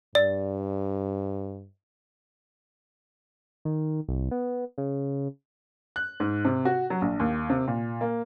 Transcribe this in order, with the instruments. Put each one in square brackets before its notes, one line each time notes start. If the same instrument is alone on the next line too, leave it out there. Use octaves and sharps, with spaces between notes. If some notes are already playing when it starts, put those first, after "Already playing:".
[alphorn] G2 [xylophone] D5
[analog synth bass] D#3
C2
B3
C#3
[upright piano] F#6
G#2
C3
F#4
F#3
A#1
D#2
C3
A#2
A#3